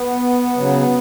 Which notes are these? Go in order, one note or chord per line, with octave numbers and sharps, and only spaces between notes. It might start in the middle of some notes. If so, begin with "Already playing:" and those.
Already playing: B3
C#3 F#3